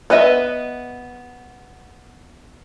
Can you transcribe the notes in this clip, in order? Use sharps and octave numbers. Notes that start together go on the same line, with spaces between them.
B3 B4 D#5 E5